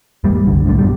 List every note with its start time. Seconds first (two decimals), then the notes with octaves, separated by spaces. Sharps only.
0.24 E2 G#2 G3 A#3
0.47 F#1 C2 D3
0.66 C2 A2 D3
0.78 G2 B2 G3